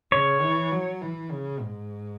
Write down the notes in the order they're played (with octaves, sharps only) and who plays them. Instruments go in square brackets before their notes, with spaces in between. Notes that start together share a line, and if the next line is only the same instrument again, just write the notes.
[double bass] C#3 [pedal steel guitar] C#5
[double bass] E3
F#3
E3
C#3
G#2